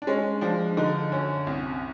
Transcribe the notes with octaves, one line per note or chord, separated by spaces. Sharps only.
D4
G#3 C#4
F3 D4
D3 D#4
F#2 C#4
C2